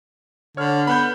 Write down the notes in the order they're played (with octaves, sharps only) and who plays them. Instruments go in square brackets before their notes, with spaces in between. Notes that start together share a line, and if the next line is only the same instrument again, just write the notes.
[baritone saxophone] D3 [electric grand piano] C#5 F6
[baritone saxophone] B3 [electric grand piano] B5 F#6 G6